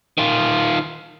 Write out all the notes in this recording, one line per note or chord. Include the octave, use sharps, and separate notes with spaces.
D#3 F4